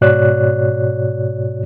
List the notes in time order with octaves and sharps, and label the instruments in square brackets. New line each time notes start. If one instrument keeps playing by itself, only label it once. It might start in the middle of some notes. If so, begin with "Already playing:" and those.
[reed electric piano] G#2 B2 F#4 C#5 D5 F#6